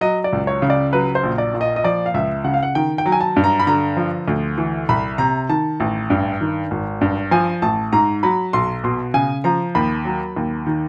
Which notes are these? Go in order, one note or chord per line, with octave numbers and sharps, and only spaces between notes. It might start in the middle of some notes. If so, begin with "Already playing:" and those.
F#3 D#5
D5
C#2
C#5
C#3
D5
F#3 B4
C5
A#1
D5
A#2
D#5
D#5
F3 D5
F5
C#2 E5
C#3 F#5
F5
F#5
D#3 G5
G5
F#3
G#5
A5
G2
A#5
B5
D3 A#5
F3
D2
E3
C2 B5
C3 A#5
D#3 A5
A1
G2
D#3
G#1
G2
F3 G#5
A1 A5
G#2 A#5
F#3 B5
B1 C6
B2 C6
C#3 G#5
F3 A#5
D#2 B5
F#3
D#2
D#3